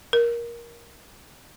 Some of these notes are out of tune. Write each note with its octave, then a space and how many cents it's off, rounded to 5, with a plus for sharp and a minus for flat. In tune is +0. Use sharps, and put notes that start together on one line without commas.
A#4 +15